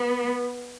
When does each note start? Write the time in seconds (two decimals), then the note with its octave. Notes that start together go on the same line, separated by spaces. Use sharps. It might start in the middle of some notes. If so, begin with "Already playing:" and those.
Already playing: B3